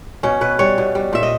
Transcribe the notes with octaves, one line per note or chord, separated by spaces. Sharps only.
B2 C#4
B2 B4
G3 C#5
B2
G3
A#2 E5
D#5